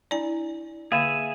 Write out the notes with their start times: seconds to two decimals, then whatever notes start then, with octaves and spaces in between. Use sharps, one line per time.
0.11 D4 E4 D5 G#5 B5
0.92 D3 A#3 G#4 E5 F5 G#5